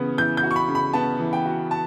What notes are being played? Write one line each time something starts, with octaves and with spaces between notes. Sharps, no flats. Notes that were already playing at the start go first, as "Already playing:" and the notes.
Already playing: C#3 E3 B3
E3 G6
G6
F#4
C#6
B5
C#3
B5
B3 A5
E3
G5
F#4
A5